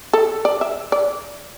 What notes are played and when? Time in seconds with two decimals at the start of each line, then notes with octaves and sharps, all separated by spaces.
0.13 A4
0.45 D5
0.61 E5
0.92 D5